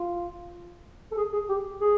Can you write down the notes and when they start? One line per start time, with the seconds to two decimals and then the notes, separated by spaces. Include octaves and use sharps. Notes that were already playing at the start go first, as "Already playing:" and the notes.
Already playing: F4
1.12 A4
1.17 G#4
1.33 G#4
1.49 G4
1.81 G#4